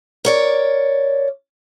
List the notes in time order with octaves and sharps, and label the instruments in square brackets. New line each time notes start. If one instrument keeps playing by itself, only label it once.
[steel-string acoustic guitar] A#4 C#5 D5